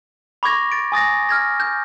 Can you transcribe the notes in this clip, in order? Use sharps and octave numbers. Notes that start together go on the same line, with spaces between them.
B5 C#6 D6 G#6 A#6
A6 D7
G#5 D#6 A6 A#6
F6 G#6 A#6
G6